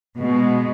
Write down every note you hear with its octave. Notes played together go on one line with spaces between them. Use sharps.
B2 G#3